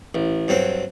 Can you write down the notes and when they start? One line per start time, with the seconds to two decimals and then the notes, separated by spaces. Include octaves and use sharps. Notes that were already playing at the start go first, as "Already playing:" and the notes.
0.15 A1
0.48 G2 F#3 C4